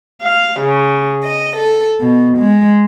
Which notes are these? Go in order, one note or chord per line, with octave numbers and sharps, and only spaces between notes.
F5
C#3
D#5
A4
B2
G#3